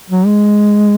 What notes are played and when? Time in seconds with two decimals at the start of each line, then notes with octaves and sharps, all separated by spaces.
0.10 F#3
0.26 G#3